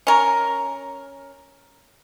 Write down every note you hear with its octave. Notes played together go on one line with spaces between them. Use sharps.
C#4 A#4